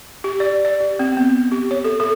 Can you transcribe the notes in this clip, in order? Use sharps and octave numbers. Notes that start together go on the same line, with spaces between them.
G4
D5
D5
G4
C4
B3
G4
C#5
A4
A4